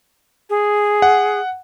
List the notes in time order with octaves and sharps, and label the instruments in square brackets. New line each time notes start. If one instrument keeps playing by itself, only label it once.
[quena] G#4
[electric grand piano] F#5